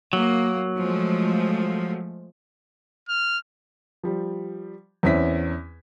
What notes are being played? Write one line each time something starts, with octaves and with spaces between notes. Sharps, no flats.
F#3 A#3
F3 G#3 A3
F6
F3 G3
E2 C4 C#4 E4 B6